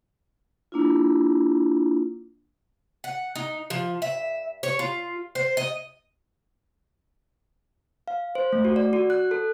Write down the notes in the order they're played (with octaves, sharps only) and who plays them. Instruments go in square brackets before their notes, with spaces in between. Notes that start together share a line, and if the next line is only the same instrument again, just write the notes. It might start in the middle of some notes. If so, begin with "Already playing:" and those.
[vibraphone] A#3 D4 E4 F4
[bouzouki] F#5
D#4
F3
E5
C#5
F4
C5
D#5
[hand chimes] F5
C5
A3
F#4
D5
F#4
F#6
A4